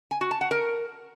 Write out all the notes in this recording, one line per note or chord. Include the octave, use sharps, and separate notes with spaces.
G#5
F#4
A5
F#5
A#4